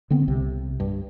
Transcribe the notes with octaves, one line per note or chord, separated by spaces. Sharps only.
D3 B3 C4
C2 C3
G2